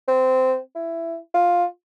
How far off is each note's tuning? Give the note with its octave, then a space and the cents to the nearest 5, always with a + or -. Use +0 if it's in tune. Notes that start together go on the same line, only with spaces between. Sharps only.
C4 -15
E4 +15
F4 +10